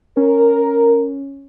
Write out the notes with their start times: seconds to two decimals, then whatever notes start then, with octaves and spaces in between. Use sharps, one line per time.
0.17 C#4 A#4